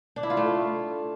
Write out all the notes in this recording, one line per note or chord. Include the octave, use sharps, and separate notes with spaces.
D4
E4
F4
A3